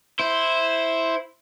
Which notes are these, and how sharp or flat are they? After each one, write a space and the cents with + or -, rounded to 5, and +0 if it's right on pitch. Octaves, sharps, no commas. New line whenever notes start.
E4 -5 C5 +0